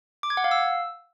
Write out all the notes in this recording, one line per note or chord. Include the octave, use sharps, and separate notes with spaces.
D6
G#6
F#5
F5
E6